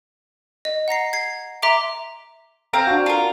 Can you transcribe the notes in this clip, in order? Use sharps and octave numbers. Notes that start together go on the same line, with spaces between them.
D#5
F#5 A#5 A#6 C7
G#6 C7
E5 A#5 C6 D6 D7
C4 F5 A#5
D4 F#4
F4 A#4